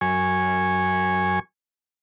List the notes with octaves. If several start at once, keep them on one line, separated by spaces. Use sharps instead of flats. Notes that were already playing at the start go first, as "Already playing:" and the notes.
F#2 G#5 C#6